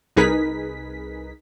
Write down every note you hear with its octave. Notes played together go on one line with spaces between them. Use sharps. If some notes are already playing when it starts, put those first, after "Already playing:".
C2 D#4 G#4 A#4 B4 B6